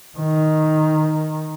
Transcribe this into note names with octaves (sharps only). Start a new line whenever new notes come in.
D#3